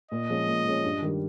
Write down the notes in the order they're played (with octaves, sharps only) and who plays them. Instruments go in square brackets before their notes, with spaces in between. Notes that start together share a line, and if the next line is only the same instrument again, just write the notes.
[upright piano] A#2 [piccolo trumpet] D#5
[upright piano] F3 G#3 C#4
A#2
F3 G#3 C#4
G2
D#3 G3